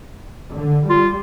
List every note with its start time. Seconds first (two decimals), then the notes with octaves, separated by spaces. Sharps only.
0.55 D3
0.90 G3 F4